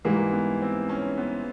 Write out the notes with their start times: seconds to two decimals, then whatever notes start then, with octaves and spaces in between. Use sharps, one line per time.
0.05 G#2 E3 G3 A#3
0.33 B3
0.61 C4
0.89 C#4
1.18 B3